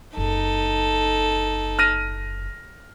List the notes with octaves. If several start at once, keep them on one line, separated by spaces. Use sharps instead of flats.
F#1 D#4 A4
F6 A#6 D#7